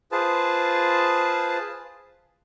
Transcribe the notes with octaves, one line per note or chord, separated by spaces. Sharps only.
F4 G#4 B4 C5 A5